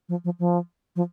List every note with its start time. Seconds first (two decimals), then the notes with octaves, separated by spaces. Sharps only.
0.09 F3
0.25 F3
0.39 F3
0.96 F3